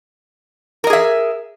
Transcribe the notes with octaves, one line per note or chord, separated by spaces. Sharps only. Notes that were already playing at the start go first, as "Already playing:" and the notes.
G#4 A#4 D#5 E5